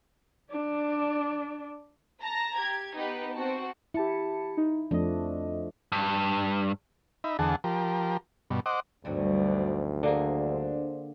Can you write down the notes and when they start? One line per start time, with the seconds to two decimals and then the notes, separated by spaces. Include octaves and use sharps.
0.51 D4 D5
2.22 A5 A#5 A#6
2.57 G4 G#6
2.96 B3 D#4 G4 B4
3.34 C4 F#4 A5
3.94 E4 G4 A5 C#7
4.57 D#4
4.91 F2 F3 A3 D4 D#5
5.92 G2
7.24 D#4 E5 B5
7.39 E2 D3 G#4 F#5 A5
7.64 F3 G4 A#4
8.50 G2 B2
8.66 C5 D#5 F#5 D6
9.05 D2 G2 B2 D#3 F#3 C5 D5
10.03 D3 A#3 D4 G#4 C5